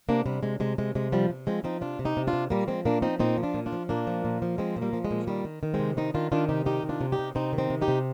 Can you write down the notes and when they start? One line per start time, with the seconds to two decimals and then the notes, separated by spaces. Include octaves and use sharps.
0.09 C3 A#3 D4
0.26 C3 G3
0.43 C3 G#3
0.60 C3 G#3
0.78 C3 G#3
0.95 C3 G#3
1.12 F3 G3
1.30 C3
1.47 F3 G#3 C4
1.64 F3 C4 D#4
1.81 C3 D4 F4
1.99 C3
2.05 D#4 G4
2.17 C3
2.27 D4 F4
2.33 C3
2.50 A#2 G3 A#3
2.68 F3 G#3 C4
2.85 A#2 A#3 D4
3.02 F3 C4 D#4
3.19 A#2 C4 D#4
3.37 F3
3.43 D4 F4
3.54 A#2
3.66 D4 F4
3.72 F3
3.89 A#2 A#3 D4
4.07 F3
4.25 A#2
4.42 F3
4.58 F3 G#3 C4
4.76 A#2
4.82 G3 A#3
4.93 F3
5.05 G#3
5.11 A#2
5.27 D#3 G3
5.45 D#3
5.63 D#3
5.74 G#3 C4
5.79 C3
5.97 D#3 C4 D#4
6.14 D#3 D4 F4
6.32 D#3 D4 F4
6.49 C3 D#4 G4
6.66 D#3 D#4 G4
6.83 C3
6.89 D4 F4
7.01 C3
7.12 D#4 G4
7.19 C3
7.35 C3 C4 D#4
7.53 D#3
7.58 C4 D#4
7.70 C3
7.81 D#4 G4
7.88 C3